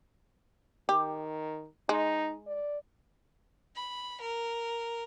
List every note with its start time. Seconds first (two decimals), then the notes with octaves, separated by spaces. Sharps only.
0.89 D#3 G4
1.89 G#3 D#4
2.47 D5
3.76 B5
4.21 A#4